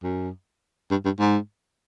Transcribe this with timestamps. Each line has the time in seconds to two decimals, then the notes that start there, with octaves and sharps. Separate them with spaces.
0.03 F#2
0.91 G2
1.05 G2
1.20 G#2